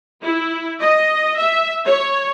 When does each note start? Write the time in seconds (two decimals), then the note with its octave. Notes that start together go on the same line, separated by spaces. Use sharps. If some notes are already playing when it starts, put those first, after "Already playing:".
0.22 E4
0.81 D#5
1.38 E5
1.86 C#5